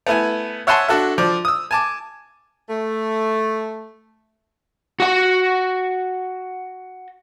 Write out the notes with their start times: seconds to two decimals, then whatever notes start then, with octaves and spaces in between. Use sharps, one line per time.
0.07 A3 B3 E4 G#5
0.67 C#5 E5 F#5 G#5 A5 C6
0.88 D4 F#4 A4 E5
1.18 F3 D5
1.45 D#6 E6
1.71 G#5 A5 D6
2.69 A3
5.00 F#4 F#5